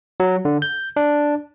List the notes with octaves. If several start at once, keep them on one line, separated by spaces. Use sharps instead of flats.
F#3
D3
G6
D4